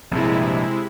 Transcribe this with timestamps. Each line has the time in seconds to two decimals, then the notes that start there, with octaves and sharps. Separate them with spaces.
0.11 A#1 G2 C3 G#3 E4